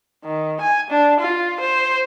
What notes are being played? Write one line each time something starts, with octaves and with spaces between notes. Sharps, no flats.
D#3
G#5
D4
F4
C5